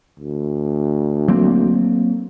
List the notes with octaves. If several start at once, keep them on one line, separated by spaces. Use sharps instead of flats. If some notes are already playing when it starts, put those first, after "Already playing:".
D2
F#3 A#3 C4